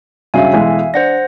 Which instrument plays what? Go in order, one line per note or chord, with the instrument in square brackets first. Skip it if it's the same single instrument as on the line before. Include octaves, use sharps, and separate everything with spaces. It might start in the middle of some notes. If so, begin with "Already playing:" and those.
[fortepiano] G2 C#3 F#3 [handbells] E5 F5 G#5
[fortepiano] B1 E3 G#3
[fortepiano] D4 [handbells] C5 F#5 A#6